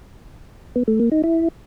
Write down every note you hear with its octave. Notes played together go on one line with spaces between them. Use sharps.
B3
A3
A#3
D#4
E4